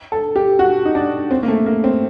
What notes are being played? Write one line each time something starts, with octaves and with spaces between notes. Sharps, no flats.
A4
G4
F#4
D#4
D4
C4
A#3
A3
A#3
C4